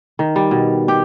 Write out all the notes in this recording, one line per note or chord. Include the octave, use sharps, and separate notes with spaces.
D#3
G3
B2
G4